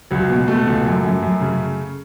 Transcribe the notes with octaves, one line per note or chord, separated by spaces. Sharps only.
C#2 F#3
B2
B2 A3
C#2
F#2
F#2
F#2
C#3